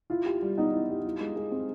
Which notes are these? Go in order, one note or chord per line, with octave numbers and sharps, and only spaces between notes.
E4 F4
G4
G3
B3 D#4
E4
G4
E4
G#3
G#3
C4